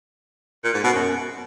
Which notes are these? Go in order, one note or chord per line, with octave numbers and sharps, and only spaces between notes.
A#2
G#2
B2
F#2